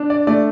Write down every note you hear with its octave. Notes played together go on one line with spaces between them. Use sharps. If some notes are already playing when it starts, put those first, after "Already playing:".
Already playing: D4
D5
A3 D5